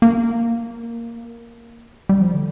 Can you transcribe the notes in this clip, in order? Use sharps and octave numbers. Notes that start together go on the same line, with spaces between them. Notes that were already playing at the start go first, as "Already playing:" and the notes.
A#3
G3
F3
D3